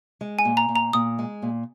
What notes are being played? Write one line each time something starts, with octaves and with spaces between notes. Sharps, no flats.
G#3
G#5
A#2
A#5
A#2
A#5
A#2 D#6
G#3
A#2